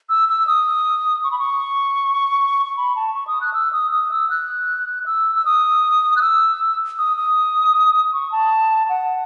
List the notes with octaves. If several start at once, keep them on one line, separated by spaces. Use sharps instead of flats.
E6
E6
D#6
C#6
B5
C#6
C#6
B5
A5
C#6
D#6
F#6
E6
D#6
D#6
E6
F#6
E6
E6
D#6
F#6
E6
D#6
D#6
C#6
A5
F#5